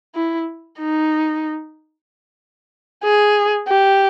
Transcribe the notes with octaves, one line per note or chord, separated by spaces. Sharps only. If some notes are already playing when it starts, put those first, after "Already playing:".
E4
D#4
G#4
G4